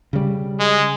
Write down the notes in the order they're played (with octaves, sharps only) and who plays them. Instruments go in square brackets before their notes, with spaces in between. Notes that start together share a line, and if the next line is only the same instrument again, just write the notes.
[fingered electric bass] C#3 G3
[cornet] G#3